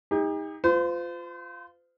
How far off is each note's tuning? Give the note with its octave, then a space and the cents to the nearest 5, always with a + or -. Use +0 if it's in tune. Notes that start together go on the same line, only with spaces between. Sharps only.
D#4 +20 G4 +45
F4 +0 C5 -40